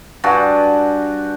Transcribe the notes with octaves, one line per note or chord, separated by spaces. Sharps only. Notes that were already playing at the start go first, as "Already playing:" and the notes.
G2 F#4 G#5 A5